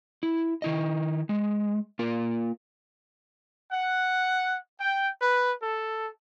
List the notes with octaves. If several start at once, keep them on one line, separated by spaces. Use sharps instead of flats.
E4
D#3 E4 D#5
G#3
A#3 F4 A#4
F#5
G5
B4
A4